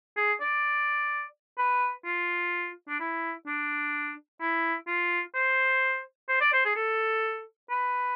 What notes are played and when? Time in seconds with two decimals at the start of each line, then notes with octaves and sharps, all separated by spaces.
0.17 G#4
0.41 D5
1.58 B4
2.05 F4
2.89 D4
3.00 E4
3.47 D4
4.41 E4
4.87 F4
5.35 C5
6.29 C5
6.41 D5
6.53 C5
6.65 G#4
6.76 A4
7.70 B4